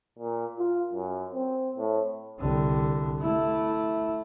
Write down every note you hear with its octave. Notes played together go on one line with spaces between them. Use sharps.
A#2
F4
F#2
C4
A2
C2 D3
A3 E4